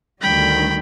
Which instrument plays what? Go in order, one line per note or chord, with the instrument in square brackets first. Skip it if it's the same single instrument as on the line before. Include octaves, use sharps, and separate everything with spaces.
[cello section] D2 D#3 G3 [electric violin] G5 B5